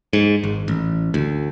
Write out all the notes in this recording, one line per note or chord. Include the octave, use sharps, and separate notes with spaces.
G#2
G#1
A1
D2